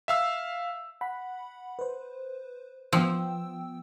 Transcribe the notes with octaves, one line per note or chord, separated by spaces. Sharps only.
E5 F5 E6
F#5 B5
B4 C5
F3 B3 G5 E6